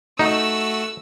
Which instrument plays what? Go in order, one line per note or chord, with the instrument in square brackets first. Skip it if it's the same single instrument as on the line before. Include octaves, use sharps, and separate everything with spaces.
[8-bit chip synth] A3 F#4 F#5 [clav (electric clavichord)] D#4 [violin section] E6